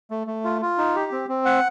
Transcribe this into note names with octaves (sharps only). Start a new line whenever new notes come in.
A3
A3
F4
F4
D#4
G4
C4
C4
F#5